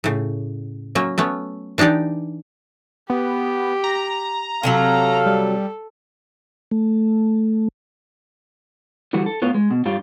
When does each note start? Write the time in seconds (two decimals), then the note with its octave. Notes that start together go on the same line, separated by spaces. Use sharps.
0.04 A2 C#3
0.95 F#3 A#3 C#4
1.18 A3 B3 C#4
1.78 E3 D4 D#4 G4 D5
3.10 B3 G4
3.84 A#5
4.63 C3 D#3 F#3 A4 F5
5.26 G3
6.71 A3
9.13 D3 E3 G3 F#4
9.26 A4
9.42 A2 B3 F4 C#5
9.54 G#3
9.71 B2
9.86 G2 G3 F4 C#5